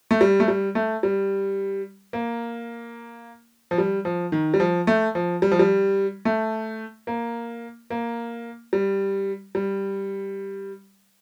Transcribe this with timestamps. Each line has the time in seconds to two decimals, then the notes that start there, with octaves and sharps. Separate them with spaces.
0.11 A3
0.21 G3
0.40 A3
0.48 G3
0.75 A3
1.03 G3
2.13 A#3
3.71 F3
3.78 G3
4.05 F3
4.32 D#3
4.54 G3
4.60 F3
4.87 A3
5.15 F3
5.42 G3
5.52 F3
5.59 G3
6.25 A3
7.07 A#3
7.90 A#3
8.73 G3
9.55 G3